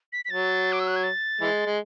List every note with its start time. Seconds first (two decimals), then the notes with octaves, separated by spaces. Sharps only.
0.13 B6
0.25 B6
0.30 F#3 A6
0.72 D6
0.80 E6
0.88 F#6
0.96 G#6
1.03 A6
1.41 E3 G#3
1.66 G#3